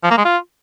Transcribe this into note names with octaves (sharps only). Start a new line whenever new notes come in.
F3
A#3
G#3
F4